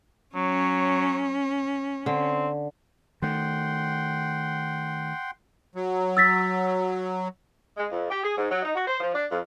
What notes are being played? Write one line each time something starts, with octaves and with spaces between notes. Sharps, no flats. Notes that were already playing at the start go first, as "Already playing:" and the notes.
F#3 C#4
D3 C4
D#3 A3 F#5 G5 C6
F#3
E6 A6 B6
G#3
F2
G4
G#4
G#2
F#3
D#4
F#4
C5
F3
D4
F2